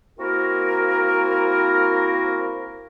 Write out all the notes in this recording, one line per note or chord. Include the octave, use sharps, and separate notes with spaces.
A#3 C4 E4 F#4 A#4